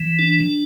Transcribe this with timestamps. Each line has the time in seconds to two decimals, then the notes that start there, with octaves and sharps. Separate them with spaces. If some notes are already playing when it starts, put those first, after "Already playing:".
Already playing: E3
0.19 D4